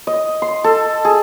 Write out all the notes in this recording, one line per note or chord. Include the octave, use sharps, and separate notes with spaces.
D#5
C6
A4
G#4